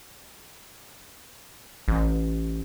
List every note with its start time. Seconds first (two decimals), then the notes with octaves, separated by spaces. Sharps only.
1.88 A1